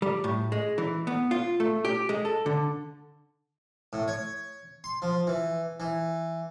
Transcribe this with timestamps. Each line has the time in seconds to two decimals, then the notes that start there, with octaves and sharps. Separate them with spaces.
0.02 G3
0.24 A2
0.52 G#3
0.78 E3
1.07 B3
1.31 F4
1.60 A3
1.85 G4
2.09 G#3
2.25 A4
2.46 D3
3.93 A2
4.08 C#5
4.84 C6
5.02 F3
5.27 E3
5.80 E3